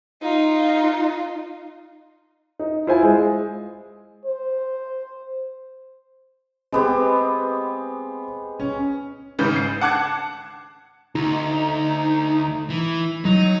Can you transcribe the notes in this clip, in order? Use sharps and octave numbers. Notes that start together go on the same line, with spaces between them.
D#4 F4
D#4
E4 F4 C5 E5 G#5
G#3
C5
G#3 B3 C4 G4
C#4
G#1 G#2 C#3 B4 G6
C7
F#5 A5 D6 F#6 G#6 C#7
D2 D#4
E3
F#3 D#4